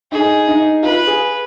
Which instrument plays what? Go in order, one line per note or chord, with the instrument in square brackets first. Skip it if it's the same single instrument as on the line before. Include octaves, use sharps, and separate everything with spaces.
[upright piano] D#4 [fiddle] G#4
[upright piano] D#4
[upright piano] F4 [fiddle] B4
[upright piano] G#4